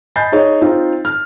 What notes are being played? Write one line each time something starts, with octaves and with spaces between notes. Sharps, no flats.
D#5 G#5 B5 G6 A6 C7
D#4 G#4 C#5 D#5
C4 D#4 F4
F6